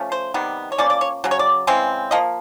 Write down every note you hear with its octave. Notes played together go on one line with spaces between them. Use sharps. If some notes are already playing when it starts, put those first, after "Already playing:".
Already playing: F3 A3 C#4
C5
C3 D#3 G3 B3
C#5
F3 A#3 C#4 D5
D5
C#5
C#3 F#3
C#5
D5
C#3 E3 G#3 C4
F3 A#3 D#5